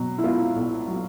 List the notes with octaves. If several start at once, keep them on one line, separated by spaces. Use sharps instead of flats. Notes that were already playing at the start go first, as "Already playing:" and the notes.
Already playing: B2 F#3
E4
B3 F4
B1
F#3